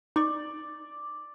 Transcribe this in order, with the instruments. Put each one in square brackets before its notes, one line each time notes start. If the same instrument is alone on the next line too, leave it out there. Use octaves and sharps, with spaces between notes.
[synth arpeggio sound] D#4 C#6 [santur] D5